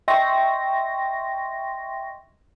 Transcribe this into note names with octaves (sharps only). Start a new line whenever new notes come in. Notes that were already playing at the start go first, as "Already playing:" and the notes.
D#5 E5 G5 C6 C#6 A#6